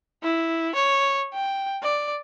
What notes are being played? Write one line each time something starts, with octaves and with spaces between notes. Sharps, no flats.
E4
C#5
G5
D5